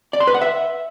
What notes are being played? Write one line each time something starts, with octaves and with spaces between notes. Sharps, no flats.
D5
C6
B4
F#5
E5